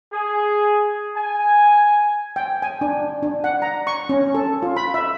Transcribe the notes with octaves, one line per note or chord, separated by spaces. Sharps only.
G#4
G#5
G5
G#5
D4
D4
F#5
A#5
C#6
C#4
A4
F4
B5
E5